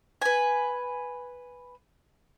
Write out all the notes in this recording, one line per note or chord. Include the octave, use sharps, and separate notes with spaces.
B4 G#5